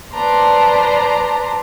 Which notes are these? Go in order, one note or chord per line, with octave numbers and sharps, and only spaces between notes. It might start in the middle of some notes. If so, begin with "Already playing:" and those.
B4 C5 D5 A5 A#5 C6